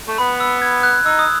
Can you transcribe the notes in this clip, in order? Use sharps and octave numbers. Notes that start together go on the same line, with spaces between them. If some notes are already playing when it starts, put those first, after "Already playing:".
A3
B3 B5
E6
G#6
F#6
D#4 E6
D#6